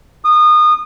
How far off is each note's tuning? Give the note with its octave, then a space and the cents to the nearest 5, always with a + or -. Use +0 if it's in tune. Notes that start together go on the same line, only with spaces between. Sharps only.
D#6 -25